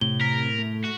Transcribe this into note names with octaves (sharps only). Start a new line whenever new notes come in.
A2 C3 G7
A#4 B6
A3
F#4